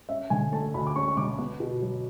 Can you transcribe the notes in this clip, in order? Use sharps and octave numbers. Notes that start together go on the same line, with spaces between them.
C#4 E5
D3 G#5
A3 A5
D2 B5
D6
C#4 C#6
C#6
D3 D6
B3
B2
F#3